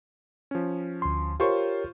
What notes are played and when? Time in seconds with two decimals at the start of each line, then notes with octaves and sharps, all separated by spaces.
0.51 F3 C#4
1.02 D2 C6
1.40 F4 G4 A#4 C5 C#5 C#6